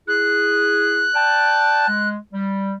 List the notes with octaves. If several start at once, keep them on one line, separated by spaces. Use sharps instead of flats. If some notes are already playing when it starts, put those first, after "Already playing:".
E4 G#4 F#6
D5 G5 A5
G#3
G3